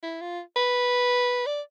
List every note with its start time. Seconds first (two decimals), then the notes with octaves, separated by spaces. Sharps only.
0.03 E4
0.21 F4
0.56 B4
1.46 D5